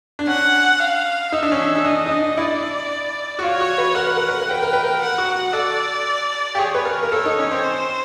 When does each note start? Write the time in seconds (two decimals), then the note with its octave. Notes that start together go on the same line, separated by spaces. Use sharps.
0.19 D4
0.27 C#4 F#5
0.80 F5
1.32 D#4 E5
1.43 D4
1.52 C#4
1.61 D4
1.76 D#4
1.84 D4 D#5
2.06 D#4
2.12 D4
2.37 E4 D5
3.39 F#4
3.43 F4 C#5
3.61 F#4
3.78 B4
3.95 A#4 F#5
4.07 B4
4.17 A#4
4.28 B4
4.39 A#4
4.49 B4 G5
4.63 A#4
4.73 B4
4.84 A#4
5.01 F#5
5.18 F#4
5.53 A4 D5
6.55 G4
6.58 G#4 C#5
6.75 B4
6.85 A#4
7.03 A#4
7.12 A4 C#5
7.25 D#4
7.39 C#4
7.51 C4
7.64 C5